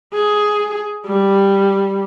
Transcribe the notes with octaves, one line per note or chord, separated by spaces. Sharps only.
G#4
G3